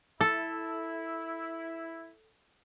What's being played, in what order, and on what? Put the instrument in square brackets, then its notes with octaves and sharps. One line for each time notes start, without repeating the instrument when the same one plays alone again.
[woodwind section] E4 [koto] A4